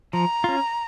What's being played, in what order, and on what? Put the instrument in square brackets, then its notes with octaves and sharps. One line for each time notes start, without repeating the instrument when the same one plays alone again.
[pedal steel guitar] F3 [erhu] A#5
[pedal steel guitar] C#4 F4